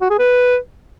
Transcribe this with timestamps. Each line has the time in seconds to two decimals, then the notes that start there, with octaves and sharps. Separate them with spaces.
0.01 F#4
0.10 G#4
0.19 B4